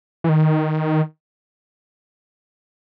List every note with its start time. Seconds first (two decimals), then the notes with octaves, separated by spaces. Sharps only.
0.24 E3
0.29 D#3